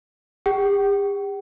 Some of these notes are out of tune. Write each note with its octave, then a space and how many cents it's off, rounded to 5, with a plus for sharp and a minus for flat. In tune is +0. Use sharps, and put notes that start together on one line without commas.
G4 +45 G5 -45